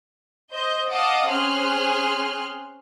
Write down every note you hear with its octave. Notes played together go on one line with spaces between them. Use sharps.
C5 D#5 G6
D#5 F5 F#5 A5 D6 D#6
C4 C#4 G#4 C6 F6 F#6